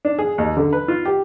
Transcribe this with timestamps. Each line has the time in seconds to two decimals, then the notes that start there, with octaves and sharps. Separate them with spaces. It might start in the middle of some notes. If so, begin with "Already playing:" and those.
0.05 D4
0.19 G#4
0.38 D#2
0.57 D3
0.73 B4
0.88 F4
1.05 G4